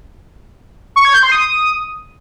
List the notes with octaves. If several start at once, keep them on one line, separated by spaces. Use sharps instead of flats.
C#6
G#6
G6
C6
D#6